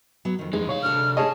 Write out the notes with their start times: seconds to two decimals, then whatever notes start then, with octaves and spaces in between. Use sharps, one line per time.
0.25 F#3 B3
0.39 F2 D#3
0.53 F2 E3 G#3 D#4
0.69 C3 C#5 F5
0.82 D2 D4 A4 F6
1.17 G#4 C#5 D#5 A5